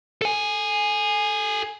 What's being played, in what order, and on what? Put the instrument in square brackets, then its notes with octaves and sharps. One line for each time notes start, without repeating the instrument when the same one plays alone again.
[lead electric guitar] A4 G#5